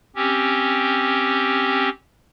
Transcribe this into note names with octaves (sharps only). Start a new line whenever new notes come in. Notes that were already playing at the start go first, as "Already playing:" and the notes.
C4 C#4 G4